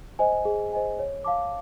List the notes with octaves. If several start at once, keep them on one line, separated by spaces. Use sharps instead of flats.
C5 D#5 G#5
G#4
C5 D#5 G#5
C#5
F5 A5 D6